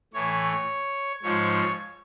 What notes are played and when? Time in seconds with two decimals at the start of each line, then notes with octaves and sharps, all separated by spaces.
0.13 A2 E3 C#5
1.23 G#2 F3 C#5